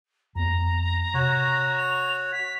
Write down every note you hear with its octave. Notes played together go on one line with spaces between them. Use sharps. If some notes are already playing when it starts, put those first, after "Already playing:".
F2 B3 A#5
C3 F#4 C#5
F7
B6